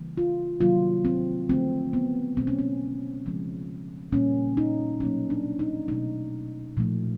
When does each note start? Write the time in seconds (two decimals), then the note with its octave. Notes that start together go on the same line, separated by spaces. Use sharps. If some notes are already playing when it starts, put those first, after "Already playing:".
Already playing: C#3 E3 G3 A#3
0.17 F4
0.61 C3 D#3 F#3 A#3 F4
1.05 C4
1.49 D3 F3 A3 C4
1.93 B3
2.37 B2 F#3 A3 C4
2.47 C#4
2.59 C4
3.25 C#3 F3 G#3
4.12 A#2 G3 A#3 C#4
4.57 D#4
5.00 B2 F#3 A#3 C#4
5.30 D4
5.59 D#4
5.88 B2 F#3 A3 D#4
6.77 A#2 F3 A3